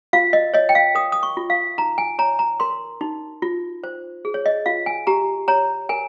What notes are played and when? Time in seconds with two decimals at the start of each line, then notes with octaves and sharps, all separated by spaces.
0.13 F4 F5
0.33 D#5
0.54 C#5 D#5
0.69 G5
0.75 F5
0.95 A#4 D#6
1.12 D#6
1.23 C#6
1.37 F4
1.50 F5
1.78 D#4 A#5
1.98 G#5
2.19 C#5 A#5
2.39 A#5
2.60 A#4 C6
3.01 D#4
3.42 F4
3.84 C5
4.25 G#4
4.34 C#5
4.46 D#5
4.66 F4 F5
4.86 G#5
5.07 G4 A#5
5.48 C#5 A#5
5.89 A#4 G#5